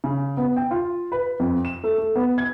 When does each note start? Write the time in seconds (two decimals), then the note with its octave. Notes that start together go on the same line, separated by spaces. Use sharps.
0.04 C#3
0.37 B3
0.57 G5
0.71 F4
1.12 B4
1.40 F2
1.65 E7
1.84 A3
1.98 A3
2.16 B3
2.38 G#6